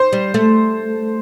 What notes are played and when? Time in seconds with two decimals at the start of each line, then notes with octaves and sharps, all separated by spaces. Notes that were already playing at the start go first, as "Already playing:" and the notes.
Already playing: C5
0.13 G3
0.34 A3